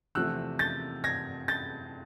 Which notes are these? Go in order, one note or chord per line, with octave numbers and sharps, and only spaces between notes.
E2 C3 F3 A3 C4 E6 F#6
G6 A6
G#6 A#6
G6 A6